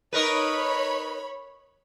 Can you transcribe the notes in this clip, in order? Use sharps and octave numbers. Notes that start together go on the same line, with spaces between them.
D#4 A#4 B4 C#5 B5